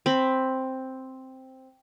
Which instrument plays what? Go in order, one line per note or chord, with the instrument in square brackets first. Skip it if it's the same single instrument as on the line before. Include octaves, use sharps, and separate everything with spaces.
[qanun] C4 B5